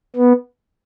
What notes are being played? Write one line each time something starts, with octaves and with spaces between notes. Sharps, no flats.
B3